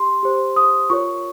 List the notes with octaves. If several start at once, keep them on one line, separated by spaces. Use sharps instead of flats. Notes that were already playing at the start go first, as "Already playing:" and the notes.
Already playing: G4 C6
G4 C5
D#6
F4 A#4 C#5 C#6